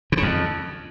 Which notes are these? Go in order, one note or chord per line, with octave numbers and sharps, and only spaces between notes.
B2
C#3
F2